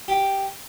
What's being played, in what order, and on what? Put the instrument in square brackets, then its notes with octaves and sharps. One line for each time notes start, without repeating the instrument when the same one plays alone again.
[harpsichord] G4